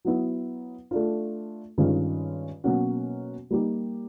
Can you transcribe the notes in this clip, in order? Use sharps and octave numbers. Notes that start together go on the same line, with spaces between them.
F#3 B3 E4
A3 D4 F4
G2 D#3 G#3 C#4 F4
B2 F#3 A#3 C#4 F#4
G3 A#3 D#4 G4